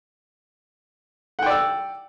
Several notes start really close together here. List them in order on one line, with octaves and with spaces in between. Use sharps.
F#5 G5 D5 E6